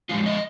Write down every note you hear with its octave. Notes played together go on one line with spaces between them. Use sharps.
D3 F3 G#3 F4
D#5